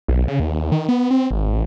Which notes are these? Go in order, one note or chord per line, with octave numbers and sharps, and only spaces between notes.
B1
C#3
D#2
D#3
B3
C4
G#1
A1